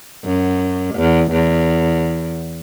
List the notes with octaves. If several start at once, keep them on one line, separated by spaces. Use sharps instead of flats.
F#2
E2
E2